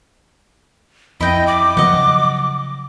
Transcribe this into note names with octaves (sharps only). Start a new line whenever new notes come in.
F2 E4 D#5 G5
D6
C#3 F3 F#3 D#5 F#5